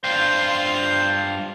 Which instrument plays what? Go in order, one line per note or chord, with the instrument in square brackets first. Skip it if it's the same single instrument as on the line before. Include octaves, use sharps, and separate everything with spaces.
[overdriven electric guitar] G2 F4 [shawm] C5